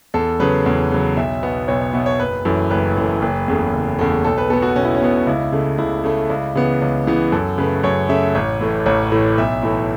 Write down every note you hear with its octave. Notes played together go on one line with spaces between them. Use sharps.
E2 A4
C#3 F#3 B4
E2
C#3 F#3
B1 E5
B2 B3
B1 C#5
C#5
B2 B3 E5
C#5
F#1 B4
F#2 E3 A3
F#1 B4
F#2 E3 A3
F#1
E2 C#3 A3
F#1
E2 C#3 A3
B1 A4
B4
B2 B3 A4
F#4
B1 C#4
E4
C#4
B2 B3
C#2 E4
C#3 A3
C#2 E4
C#3 A3
C#2
C#3 E3 B3
C#2
C#3 E3 B3
F#2 A4
C#3 A3 B4
F#2 C#5
C#3 A3 E5
A1 C#5
A2 E3 A3
A1 C#5
A2 E3 A3
B1 E5
A2 E3 A3